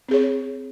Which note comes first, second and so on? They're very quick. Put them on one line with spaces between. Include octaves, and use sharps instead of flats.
C4 G#4 C#5